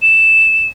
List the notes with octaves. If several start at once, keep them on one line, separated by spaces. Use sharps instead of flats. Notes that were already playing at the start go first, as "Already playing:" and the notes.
E7